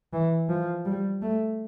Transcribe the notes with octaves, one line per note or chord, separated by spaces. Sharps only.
E3
F3
G3
A3